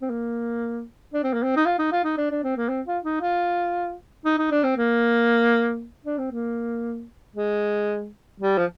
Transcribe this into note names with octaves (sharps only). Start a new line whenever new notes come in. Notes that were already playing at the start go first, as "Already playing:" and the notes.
C4
A#3
D4
C4
A#3
C4
D#4
F4
D#4
F4
D#4
D4
D4
C4
A#3
C4
F4
D#4
F4
D#4
D#4
D4
C4
A#3
D4
C4
A#3
G#3
G3
F3